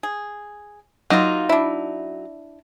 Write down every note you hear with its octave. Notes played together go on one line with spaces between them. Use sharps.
G#4
F#3 A#3 D#4 F4
D4 E4